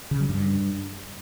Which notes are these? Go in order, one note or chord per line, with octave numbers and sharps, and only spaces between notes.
C#3
F#3
G2